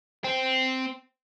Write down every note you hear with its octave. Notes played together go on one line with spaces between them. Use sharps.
C4